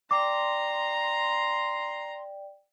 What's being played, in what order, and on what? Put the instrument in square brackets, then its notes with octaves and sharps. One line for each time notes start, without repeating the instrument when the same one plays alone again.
[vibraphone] D5 G5 [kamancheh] A#5 [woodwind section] C6 [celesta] D6